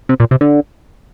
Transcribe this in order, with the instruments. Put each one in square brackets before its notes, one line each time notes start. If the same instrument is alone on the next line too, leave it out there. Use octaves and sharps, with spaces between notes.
[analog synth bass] C3
A#2
C3
D3